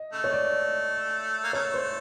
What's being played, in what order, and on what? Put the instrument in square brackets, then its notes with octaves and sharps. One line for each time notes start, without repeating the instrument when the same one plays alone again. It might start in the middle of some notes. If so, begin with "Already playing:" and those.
Already playing: [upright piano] D#5
[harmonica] C#3 A3
[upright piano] C#5
D5
[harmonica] A#3
[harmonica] C#3 A3 [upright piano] C#5
[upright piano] C5